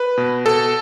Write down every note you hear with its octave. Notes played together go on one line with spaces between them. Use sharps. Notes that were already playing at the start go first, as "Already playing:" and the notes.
Already playing: B4
B2
B2 A4